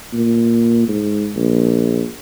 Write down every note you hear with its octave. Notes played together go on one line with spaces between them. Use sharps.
A#2
G#2
A#1